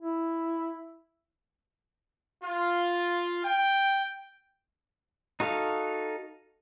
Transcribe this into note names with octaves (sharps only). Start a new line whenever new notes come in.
E4
F4
G5
D#4 F#4 A4 F5